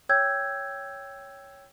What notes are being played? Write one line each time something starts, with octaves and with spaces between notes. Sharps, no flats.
C#5 G5 E6 G6 G#6